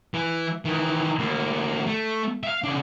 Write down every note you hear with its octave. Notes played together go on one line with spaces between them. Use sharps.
E3
D#3 E3
D2 A#3
A3
E5 F5
C#3 D4